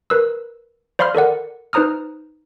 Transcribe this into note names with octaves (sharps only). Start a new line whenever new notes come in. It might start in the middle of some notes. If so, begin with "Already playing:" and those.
A#4 B4 E6
C5 D5 F5 B5 C6 F6
A4 A#4 D5 F#5
D#4 B4 C5 A#5 D#6 F6